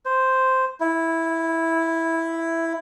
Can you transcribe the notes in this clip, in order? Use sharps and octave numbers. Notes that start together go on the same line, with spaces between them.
C5
E4